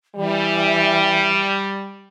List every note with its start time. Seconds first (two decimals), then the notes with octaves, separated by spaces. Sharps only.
0.16 E3 G3